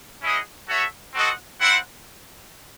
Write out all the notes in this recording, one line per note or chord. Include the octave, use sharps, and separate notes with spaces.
C#4 E4 G#4 D#5 F#5
F#4 A4 C#5 E5
C4 F#4 A4 D#5 F#5
C4 E4 C5 F#5